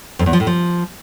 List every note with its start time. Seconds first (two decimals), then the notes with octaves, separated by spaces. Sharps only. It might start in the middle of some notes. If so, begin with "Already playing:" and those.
0.19 F2
0.26 E2
0.33 F3
0.40 A2
0.47 F3